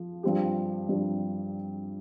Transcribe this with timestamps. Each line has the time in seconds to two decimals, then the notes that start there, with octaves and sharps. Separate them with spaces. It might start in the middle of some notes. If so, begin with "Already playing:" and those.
Already playing: F3
0.23 G2 F3 C4 G4
0.89 G2 F3 C4 G4